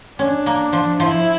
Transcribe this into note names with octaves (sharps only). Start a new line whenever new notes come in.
C#4 D4
A#3
F3
F3 E4